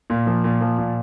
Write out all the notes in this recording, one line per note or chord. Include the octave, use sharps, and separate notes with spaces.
A#2
F3
A#2
F3
A#2